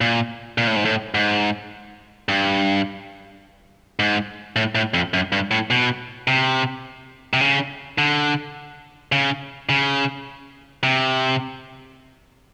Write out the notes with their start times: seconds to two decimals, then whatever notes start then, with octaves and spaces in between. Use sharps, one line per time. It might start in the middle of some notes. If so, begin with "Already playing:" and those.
0.01 A#2
0.58 A#2
0.67 A2
0.76 G#2
0.85 A2
1.14 G#2
2.29 G2
3.99 G#2
4.56 A2
4.75 A2
4.94 F2
5.14 F#2
5.32 G2
5.51 A2
5.71 B2
6.28 C3
7.33 C3
7.41 C#3
7.98 D3
9.12 C#3
9.69 C#3
10.83 C3